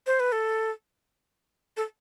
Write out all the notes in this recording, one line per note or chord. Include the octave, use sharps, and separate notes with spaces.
C5
B4
A4
A4